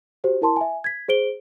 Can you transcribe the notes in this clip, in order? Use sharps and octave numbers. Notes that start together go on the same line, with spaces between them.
F#4 G4 C5
E4 A#4 A5 C6
E5 G#5
G#6 B6
G#4 C5 D7 G7